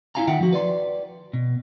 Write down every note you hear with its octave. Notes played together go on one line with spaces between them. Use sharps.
E4 F4 F5 G#5 A#5
D#3 F4 E5 F#5 G5
F3 F#4
B4 D5 C6
B2